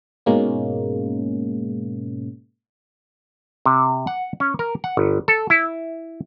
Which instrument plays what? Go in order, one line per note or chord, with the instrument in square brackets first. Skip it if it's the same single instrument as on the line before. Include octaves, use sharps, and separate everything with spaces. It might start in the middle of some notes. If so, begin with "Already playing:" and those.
[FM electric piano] G#2 B2 G#3 A#3 C#4
[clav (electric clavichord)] C3
F#5
C#4
A#4
F#5
G1
A4
E4